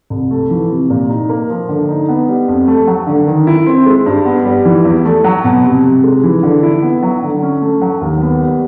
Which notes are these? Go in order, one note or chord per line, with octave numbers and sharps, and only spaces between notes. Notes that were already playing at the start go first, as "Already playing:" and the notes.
C2
A3
E3
C3
A#2
D#4
A#3
F3
D3
D#4
B3
G3
F2
A3
F#3
D3
D#3
E4
C4
G#3
G2
B3
G3
E3
E2
A3
F#3
B2
C3
C3
G#3
E3
D3
E4
B3
F#3
D3
C#4
A3
F#3
D#2
B3
G3